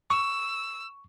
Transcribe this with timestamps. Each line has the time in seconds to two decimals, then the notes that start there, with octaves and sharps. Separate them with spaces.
0.10 C#6 E6